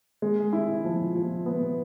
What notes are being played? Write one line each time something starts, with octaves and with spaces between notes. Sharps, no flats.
G#3
E4
F3
F3
B3